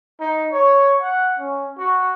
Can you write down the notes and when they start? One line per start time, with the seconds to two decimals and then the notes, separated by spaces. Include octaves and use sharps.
0.20 D#4
0.52 C#5
1.01 F#5
1.39 C#4
1.78 F#4